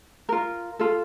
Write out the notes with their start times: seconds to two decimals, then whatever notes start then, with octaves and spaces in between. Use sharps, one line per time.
0.29 F4 A#4
0.79 F4 A4